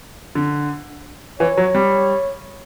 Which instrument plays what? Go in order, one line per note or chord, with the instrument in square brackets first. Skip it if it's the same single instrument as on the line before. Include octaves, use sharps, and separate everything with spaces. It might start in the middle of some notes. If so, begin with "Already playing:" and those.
[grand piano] D3
[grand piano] E3 [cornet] C#5
[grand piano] F#3
G3